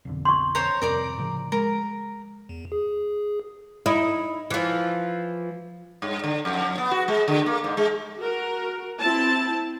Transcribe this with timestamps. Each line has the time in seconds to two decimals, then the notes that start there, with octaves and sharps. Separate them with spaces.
0.05 B1 F2 D3
0.25 C6 C#6
0.55 C5 C#5 A#5
0.82 C2 F2 A#4 D5 A#5
1.17 A2 C#3 F3
1.52 G#3 A#4
2.49 E2
2.72 G#4
3.86 D#4 E4
4.50 E3 F3
6.02 G2
6.24 D3
6.45 F2
6.78 B3
6.91 F#4
7.08 G#3
7.28 D3
7.46 A#3
7.64 G#2
7.77 G#3
8.18 F#4 A#4
9.00 C4 E4 A5